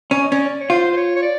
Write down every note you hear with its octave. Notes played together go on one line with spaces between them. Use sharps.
C#4
D#5
C#4 D5
C#5
F4 C5
C5
C#5
C#5
D5